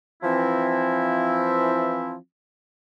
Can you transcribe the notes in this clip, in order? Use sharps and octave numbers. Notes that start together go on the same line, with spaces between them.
E3 F3 C4 E4